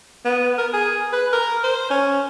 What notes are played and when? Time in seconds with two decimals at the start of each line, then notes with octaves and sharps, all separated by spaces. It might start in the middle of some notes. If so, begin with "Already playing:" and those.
0.25 B3
0.58 A#4
0.74 G#4
1.13 B4
1.33 A#4
1.64 C5
1.90 C#4